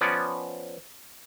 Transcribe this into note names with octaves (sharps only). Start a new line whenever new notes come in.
F3 B3 C#4 D5